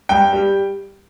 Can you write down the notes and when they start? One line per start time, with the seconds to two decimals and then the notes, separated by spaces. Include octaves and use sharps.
0.09 G2 G5
0.33 G3